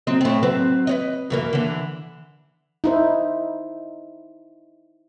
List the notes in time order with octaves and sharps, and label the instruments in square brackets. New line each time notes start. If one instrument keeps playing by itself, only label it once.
[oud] F#3 C4 D#5
A2 C4
F#3 C4 B4
B4 C#5 D#5
F#2 E3 A#3
D3 E3
[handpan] D#4 E4 C5